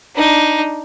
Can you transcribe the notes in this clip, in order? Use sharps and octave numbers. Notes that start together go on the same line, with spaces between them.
D4 D#4